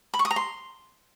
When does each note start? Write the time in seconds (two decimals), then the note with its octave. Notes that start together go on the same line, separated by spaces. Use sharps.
0.14 B5
0.19 C#6
0.25 D#6
0.31 A#5
0.36 C6